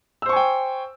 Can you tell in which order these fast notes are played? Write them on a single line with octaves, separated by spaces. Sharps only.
E6 C5 C#6 G#5 G5